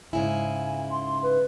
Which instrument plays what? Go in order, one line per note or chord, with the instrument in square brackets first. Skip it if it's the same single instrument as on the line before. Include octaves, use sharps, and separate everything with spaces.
[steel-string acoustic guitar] G#2 C#3 E4 [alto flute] G#5
[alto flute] C6
B4